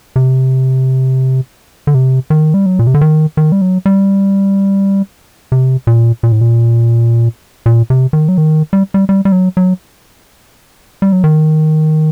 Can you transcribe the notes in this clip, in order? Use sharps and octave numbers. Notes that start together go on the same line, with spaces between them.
C3
D3
C3
D#3
G3
F#3
A#2
C3
D3
D#3
D#3
G3
F#3
G3
C3
A#2
A#2
A2
A#2
A#2
C3
D#3
F#3
D#3
G3
G3
G3
G3
F#3
F#3
G3
F#3
D#3